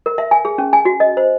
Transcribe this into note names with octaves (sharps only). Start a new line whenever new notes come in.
A#4
E5
G#5
G#4
C#4
G#5
F#4
D#5
C5